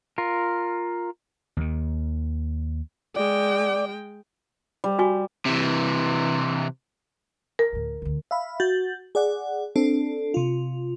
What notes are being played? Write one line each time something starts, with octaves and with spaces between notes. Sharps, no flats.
F4 A#4
D#2 D#3
G#3 D5 G5
G3
F#4 G#5 C#6
C3 E3
A#4
D2 A2
D2 D3
E5 F5 B5
F#4 G6 A6
G#4 D5 F#5
C4 D4 A4
C3 F4